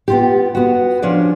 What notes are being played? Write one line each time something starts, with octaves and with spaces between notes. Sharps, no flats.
B3 F4 G4
B3 F#4
F3 C#4 D4 C#5 D5